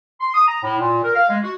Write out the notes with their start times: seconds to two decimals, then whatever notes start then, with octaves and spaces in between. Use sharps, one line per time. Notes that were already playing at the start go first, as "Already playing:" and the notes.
0.21 C6
0.34 D#6
0.48 A#5
0.63 A2
0.79 A#2
1.03 A#4
1.15 F5
1.29 G#3
1.43 F#4